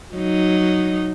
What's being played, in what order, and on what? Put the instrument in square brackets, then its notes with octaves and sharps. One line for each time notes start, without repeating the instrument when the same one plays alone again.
[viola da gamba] F#3 D#4